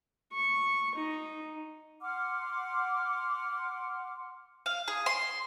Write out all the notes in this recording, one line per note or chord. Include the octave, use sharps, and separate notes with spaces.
C#6
D#4
F#5 C6 D6 F6
F5
G#4
C6